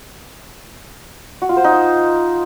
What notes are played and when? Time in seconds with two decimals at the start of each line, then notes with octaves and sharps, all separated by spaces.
1.42 F#4
1.49 F4
1.57 C5
1.64 D#4
1.72 D#5